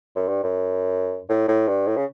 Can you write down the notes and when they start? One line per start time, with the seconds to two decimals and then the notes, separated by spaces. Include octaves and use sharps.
0.16 F#2
0.28 G2
0.43 F#2
1.29 A2
1.48 A2
1.68 G2
1.87 A2
1.97 C#3